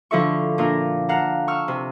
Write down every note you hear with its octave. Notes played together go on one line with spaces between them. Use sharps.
D3 F3 E4 A4 E5 C#6
A#2 D4 A#4
F5 F#5 A5 A#5
C#6 E6 F6
C3